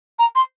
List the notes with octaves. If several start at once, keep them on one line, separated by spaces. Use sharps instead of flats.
A#5
C6